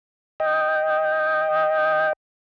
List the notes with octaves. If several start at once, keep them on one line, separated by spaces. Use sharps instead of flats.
D#5 G5